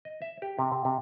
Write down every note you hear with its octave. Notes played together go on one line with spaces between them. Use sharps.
D#5
E5
G4
C3
C3
C3